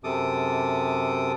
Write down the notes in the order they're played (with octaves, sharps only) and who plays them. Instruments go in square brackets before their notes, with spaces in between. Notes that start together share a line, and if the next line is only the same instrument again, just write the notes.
[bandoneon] F#2 C3 A4 D6 D#6